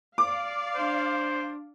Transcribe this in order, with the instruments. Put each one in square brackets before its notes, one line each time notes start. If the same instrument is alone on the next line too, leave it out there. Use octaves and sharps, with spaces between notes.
[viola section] D5 F5 [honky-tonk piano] D6
[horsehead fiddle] D4 [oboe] C5